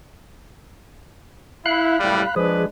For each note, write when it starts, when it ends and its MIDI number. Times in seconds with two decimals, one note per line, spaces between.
1.66 1.97 64
1.66 2.35 77
1.66 2.35 83
1.66 2.35 90
2.00 2.23 30
2.00 2.23 45
2.00 2.23 55
2.36 2.66 53
2.36 2.64 56
2.36 2.64 62
2.36 2.66 68
2.36 2.64 71